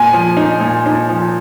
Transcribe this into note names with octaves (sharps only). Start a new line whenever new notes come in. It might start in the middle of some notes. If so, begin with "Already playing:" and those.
Already playing: A#2 G#5
F3
D#4
A#2
D#4
F3